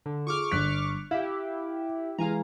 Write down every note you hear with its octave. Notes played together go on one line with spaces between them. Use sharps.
D3
F4 G#4 C#6 D6 F6
G1 F#6 B6
E4 G4 F5
E3 G#3 F5 G#5 A#5